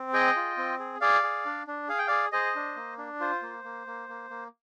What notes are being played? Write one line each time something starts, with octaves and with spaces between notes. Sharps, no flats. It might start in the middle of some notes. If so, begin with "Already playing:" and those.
Already playing: C4
G#4 D#5 G5
F4
C4
G#4
G#4 D5 F5
G#4
D4
D4
G#4 F5
G5
G#4 D5 F5
G#4 C5 D#5
D4
A#3
D4
F4 C5
A#3
A#3
A#3
A#3
A#3